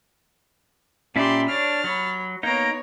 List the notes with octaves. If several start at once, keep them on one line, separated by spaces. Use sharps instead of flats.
A#2 C#4 G4 D5 E5 B5 C6
D4 C#5 F6 A6
F#3 C#5 B5
A#3 B3 D#4 C#5 A#5 D7